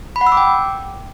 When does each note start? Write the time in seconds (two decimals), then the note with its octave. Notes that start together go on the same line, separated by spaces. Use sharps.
0.16 B5
0.21 F#5
0.27 E6
0.32 D6
0.37 G5